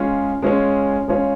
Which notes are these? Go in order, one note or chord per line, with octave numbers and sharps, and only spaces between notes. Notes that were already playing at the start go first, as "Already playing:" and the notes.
Already playing: G#3 C#4 F4 G#4 C#5
G#3 C#4 F4 G#4 C#5
G#3 C#4 F4 G#4 C#5